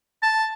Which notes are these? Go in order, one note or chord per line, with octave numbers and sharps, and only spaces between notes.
A5